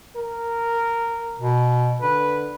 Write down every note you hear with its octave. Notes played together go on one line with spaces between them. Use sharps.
A#4
B2
D3 B4